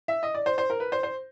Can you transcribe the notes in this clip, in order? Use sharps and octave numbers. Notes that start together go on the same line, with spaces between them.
E5
D#5
D5
C5
C5
A#4
B4
C5
C5